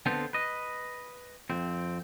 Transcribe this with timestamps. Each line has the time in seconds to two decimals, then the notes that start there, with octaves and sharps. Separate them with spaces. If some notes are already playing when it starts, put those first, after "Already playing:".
0.06 D3 B3 C4 F4 A4 C5
0.33 B4 D#5
1.50 F2 C4